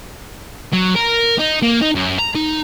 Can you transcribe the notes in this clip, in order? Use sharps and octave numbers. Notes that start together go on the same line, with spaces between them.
F#3
A#4
D#4
A#3
D#4
F#2
A#5
D#4